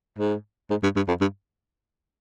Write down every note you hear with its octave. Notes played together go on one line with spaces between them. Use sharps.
G#2
G#2
G2
G2
F2
G2